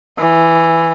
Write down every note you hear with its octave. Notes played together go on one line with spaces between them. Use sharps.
E3